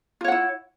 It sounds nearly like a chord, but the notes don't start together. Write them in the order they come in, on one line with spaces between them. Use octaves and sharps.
F4 C#5 F#5 E4